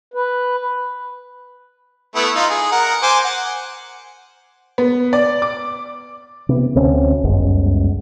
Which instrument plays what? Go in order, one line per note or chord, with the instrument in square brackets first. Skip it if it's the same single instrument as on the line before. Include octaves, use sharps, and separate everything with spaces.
[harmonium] B4
[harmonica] A3 B3 E4
D#4 F4
G#4
A#4 F#5
C5 G#5 D6
F#5
[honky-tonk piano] B3
D5
D6
[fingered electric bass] C3 B3
D2 C4 C#4
G1 C#2 F#2 G#3